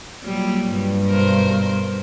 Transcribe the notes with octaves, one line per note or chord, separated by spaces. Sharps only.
A#2 F#3 G3
G2
B2 A#4 C5